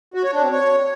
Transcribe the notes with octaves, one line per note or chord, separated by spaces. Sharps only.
F#4
C#5
D4
C4
C#5